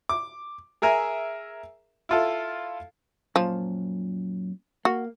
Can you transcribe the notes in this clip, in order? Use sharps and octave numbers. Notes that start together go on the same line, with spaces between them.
D6
G#4 A#4 E5 G#5 A#5
E4 F4 A4
F#2 A#2 F3
A#3 F#4